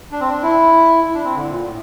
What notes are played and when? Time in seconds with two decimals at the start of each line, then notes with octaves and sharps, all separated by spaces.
0.12 D4
0.21 C4
0.29 D4
0.43 E4
1.04 E4
1.14 D4
1.25 C4
1.35 D3
1.50 A#2
1.65 A2